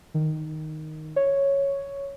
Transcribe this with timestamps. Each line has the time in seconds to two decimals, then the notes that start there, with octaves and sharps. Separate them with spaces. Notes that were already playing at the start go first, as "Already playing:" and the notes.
0.14 D#3
1.16 C#5